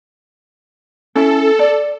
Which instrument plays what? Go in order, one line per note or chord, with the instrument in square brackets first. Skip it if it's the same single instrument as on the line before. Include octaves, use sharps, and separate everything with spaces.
[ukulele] C#4 E4 [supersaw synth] A4
[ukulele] D5